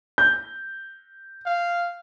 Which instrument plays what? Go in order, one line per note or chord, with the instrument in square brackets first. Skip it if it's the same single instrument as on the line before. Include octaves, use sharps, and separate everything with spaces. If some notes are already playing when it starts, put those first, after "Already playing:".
[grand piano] G6
[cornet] F5